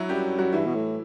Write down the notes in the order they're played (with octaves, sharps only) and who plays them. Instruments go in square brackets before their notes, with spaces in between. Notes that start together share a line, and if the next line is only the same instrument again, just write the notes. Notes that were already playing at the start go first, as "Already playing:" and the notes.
Already playing: [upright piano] F#3 E4 F#4
[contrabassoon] F#2 [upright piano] G3 G4
[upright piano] F#3 F#4
[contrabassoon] G2 [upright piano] E3 E4
[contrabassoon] B2
A2